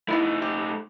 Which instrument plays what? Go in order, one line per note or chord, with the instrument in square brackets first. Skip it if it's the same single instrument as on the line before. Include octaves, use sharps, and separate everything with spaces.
[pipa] E3 B3 E4 [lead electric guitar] A3 D#4
[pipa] G4